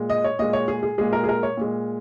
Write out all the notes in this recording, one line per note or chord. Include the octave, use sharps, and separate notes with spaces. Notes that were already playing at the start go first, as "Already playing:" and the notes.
Already playing: A#2 G#3
D#5
C#5
A#2 G#3 D#5
C#5
G#4
G#4
A#2 G#3 G#4
A#4
G#4
A#4
C#5
A#2 G#3